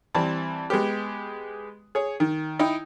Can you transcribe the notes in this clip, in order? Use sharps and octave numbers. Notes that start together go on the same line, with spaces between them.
E3 G3 C4 A5
G#3 B3 G4
G#4 C#5
D#3
D#4 E4 G5 D#6